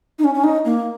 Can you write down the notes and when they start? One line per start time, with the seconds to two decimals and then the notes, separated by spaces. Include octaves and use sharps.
0.19 D#4
0.24 C#4
0.34 C#4
0.44 D#4
0.65 A#3